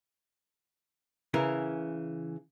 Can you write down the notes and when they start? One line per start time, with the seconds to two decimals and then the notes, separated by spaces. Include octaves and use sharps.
1.34 C#3 E3 A#4